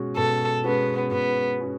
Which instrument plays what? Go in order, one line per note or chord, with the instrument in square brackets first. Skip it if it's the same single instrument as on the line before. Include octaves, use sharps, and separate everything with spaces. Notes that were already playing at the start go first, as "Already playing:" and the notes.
Already playing: [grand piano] B2 G#3 C#4 F#4
[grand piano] B2 [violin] A4
[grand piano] G#3 C#4 F#4 [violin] B3
[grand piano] B2 [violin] B3
[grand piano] G#3 C#4 F#4